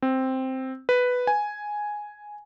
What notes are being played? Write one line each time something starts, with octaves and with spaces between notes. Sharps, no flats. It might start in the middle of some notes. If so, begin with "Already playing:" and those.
C4
B4
G#5